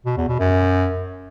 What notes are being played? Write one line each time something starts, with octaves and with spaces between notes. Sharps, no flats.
B2
E2
B2
F#2